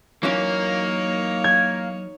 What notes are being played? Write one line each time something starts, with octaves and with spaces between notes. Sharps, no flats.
E3 F#3 A#3 C#4 D#4 C#5
G#6